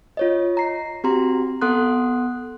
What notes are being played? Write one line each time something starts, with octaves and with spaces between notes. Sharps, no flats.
F4 C#5 D#5
A#5 C7
C4 F#4 G4 A#5 C6
B3 A4 F#5 C6 D#6 F#6